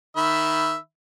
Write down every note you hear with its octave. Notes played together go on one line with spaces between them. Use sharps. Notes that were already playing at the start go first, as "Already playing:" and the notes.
D#3 E5 B5